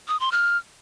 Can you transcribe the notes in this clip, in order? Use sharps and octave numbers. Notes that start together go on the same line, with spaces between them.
D#6
C6
F6